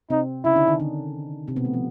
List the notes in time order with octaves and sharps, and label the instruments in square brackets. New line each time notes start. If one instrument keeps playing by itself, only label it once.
[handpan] C3 C4 [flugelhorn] D#4
[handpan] C#3 C#4 [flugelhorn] E4
[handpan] D#4
D3 D4
D#3 D#4
D3 D4
C3 C4
B2 B3
A3
F3